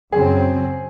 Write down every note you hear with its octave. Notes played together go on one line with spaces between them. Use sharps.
F#2 C#3 F#3 C4 G#4